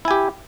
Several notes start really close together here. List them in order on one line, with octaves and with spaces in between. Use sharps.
E4 G#5 G4